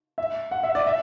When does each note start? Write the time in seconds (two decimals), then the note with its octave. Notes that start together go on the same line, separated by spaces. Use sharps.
0.18 E5
0.51 F#5
0.63 E5
0.75 D5
0.87 E5